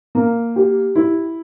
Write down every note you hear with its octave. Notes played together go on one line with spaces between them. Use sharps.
A#3
G4
E4